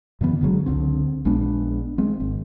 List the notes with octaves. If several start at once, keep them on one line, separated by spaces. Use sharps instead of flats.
F#2 D3 E3 B3
F#1 D3 F#3 G#3
C#2 D3 C4
A#1 G#3 B3 D4
G#3 C4
G#1